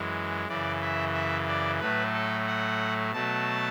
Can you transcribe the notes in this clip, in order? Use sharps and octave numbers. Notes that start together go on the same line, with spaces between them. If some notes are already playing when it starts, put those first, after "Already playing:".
Already playing: F#2 E3 G#3
F#2 C#3 E3 D5
E5
E5
D5
A2 F#3 A3 B4
A4
F#5
B2 F#3 A3 A5